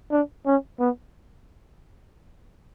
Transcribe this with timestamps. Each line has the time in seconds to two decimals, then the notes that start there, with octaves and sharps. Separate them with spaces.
0.11 D4
0.46 C#4
0.80 B3